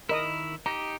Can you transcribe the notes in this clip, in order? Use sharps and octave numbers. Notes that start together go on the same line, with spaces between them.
D#3 E4 A#4 D#5 D#6
D#4 G4 A#5